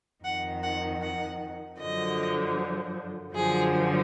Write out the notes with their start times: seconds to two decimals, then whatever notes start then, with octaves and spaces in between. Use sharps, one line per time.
0.24 F2 D#3 F#5
0.63 F#5
1.02 F#5
1.79 F#2 D3 F3 D#5
3.34 F#2 D3 F3 G#4